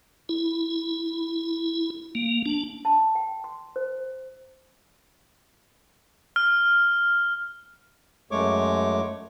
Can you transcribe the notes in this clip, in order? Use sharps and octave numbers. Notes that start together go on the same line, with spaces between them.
E4
A#3
D4
A5
G5
C6
C5
F6
F#2 G#3 A3 C#5 C#6 D6